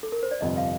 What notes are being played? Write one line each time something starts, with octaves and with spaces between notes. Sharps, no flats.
A4
A#4
C5
D5
G1 F2 C3 G3 D#5
F5